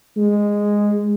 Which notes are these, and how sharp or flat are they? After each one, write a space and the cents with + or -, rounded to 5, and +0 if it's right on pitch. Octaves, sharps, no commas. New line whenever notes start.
G#3 -10